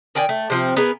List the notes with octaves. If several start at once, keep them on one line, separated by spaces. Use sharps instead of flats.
D#3 D5 G5 G#5
A3
C3 F3 C4
B3 G#4 A#4